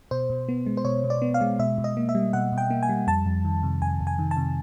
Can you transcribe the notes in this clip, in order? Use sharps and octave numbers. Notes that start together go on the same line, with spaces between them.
B2 C5
B2
B3
G#3
C5
B2 C#5
B2
D5
B3
F5
G#3
B2 E5
B2
D#5
A#3
E5
G3
B2 F#5
B2
G5
A#3
G#5
G3
F2 A5
F2
D#3
C3
F2 G#5
F2
G#5
D#3
A5
C3